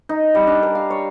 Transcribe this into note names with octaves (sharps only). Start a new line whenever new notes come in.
D#4
G3
D4
A#4
F5
C#5